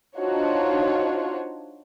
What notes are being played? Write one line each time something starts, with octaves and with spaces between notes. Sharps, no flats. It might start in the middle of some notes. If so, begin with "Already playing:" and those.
D4 D#4 F4 F#4 C5 C#5